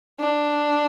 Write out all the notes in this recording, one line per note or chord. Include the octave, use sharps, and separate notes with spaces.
D4